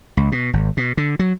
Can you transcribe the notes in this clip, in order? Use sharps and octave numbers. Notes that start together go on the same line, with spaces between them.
C#2
B2
G#1
B2
D3
F#3